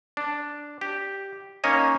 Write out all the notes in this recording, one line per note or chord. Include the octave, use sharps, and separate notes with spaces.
D4
G4
A#3 C#4 D#4 C#5 D#5 G#5